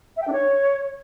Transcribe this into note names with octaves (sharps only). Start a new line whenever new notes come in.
E5
G5
D4
C#5